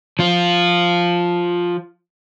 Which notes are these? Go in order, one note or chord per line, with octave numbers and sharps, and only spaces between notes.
F3 F4